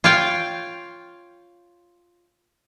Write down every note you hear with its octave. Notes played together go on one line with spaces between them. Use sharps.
F4 C#5 F5 G5